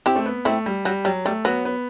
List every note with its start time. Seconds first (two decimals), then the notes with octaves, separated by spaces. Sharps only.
0.06 C4 E4 G4
0.16 A3
0.26 B3
0.45 A3 C4 E4
0.66 G3
0.85 F#3 G3
1.05 F#3 G3
1.25 G3 A3
1.45 F#3 B3
1.65 B3